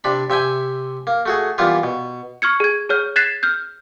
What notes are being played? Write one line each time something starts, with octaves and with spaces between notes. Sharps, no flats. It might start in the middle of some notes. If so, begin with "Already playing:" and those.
C3 D4 B5
C3 E5 G5 G#5
A#3
A3 F#4 G#4
E3 G3 A#3 B3 F4
B2
C#6 F6 G#6 C#7
G#4 G#6
G#4 C#5 F6 G6
F#6 G#6 A6 B6 C7 E7
F6 G6